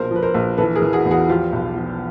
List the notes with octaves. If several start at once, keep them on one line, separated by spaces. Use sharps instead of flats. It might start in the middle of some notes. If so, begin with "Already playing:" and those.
Already playing: A#1 B2 A#4 C5
F3 B4
A#4 C5
A#1
E3 A4 B4
G#4 A#4
E3
F#4 G#4
E2
F#4 G#4
F3 F4 G4
B1
F3